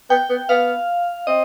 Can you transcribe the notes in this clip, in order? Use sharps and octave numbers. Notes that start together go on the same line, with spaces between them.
B3 G5
B3
B3 F5
C4 D#5